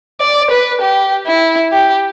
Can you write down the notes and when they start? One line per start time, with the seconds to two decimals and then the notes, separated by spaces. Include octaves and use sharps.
0.21 D5
0.51 B4
0.81 G4
1.26 E4
1.72 G4